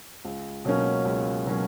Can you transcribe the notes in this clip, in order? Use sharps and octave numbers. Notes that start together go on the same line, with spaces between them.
C#2
B2 F#3 A#3 C#4
C#2
B2 F#3 A#3 C#4